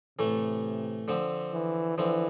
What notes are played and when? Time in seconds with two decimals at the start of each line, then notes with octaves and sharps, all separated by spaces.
0.19 A2 C3 E3 A3
1.08 D3 F3 C4
1.53 E3
1.98 D3 E3 F3 C4